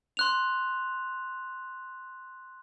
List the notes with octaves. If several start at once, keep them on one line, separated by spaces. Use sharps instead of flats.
C6 F#6 F7